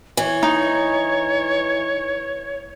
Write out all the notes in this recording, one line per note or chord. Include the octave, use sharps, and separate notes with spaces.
E3 C#5
D#4